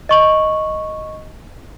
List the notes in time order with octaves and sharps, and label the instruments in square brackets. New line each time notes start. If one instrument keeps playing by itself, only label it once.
[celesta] D#5 C#6 F#7